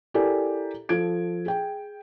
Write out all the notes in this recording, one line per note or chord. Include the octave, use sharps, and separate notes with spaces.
E4 G4 A4 A#4 D5 G#5
F3 A4 G#6 D7
G#4 G5